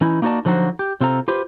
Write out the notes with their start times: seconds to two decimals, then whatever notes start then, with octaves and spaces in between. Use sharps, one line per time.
0.01 E3 C#4 D#4 E4
0.22 A#3 D#4 F#4 B4 D5 A5
0.45 D3 F3 F#3 D#4 F#4 C5
0.79 G4
1.00 C3 C4 F4 A4 A#5
1.28 F4 G4 B4 C5